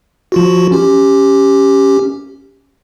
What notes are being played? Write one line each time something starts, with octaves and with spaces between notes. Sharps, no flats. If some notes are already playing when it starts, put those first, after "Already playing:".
F3 F4 F#4
C#4 G4